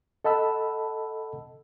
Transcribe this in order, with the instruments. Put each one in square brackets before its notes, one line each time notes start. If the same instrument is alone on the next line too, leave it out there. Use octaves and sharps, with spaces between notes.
[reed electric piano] A4 D#5 F#5 A5 B5 E6